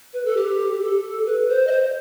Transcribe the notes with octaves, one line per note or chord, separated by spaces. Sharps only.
B4
A4
G4
G4
A4
B4
C5
D#5
C5